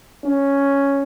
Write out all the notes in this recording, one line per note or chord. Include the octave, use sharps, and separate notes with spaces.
C#4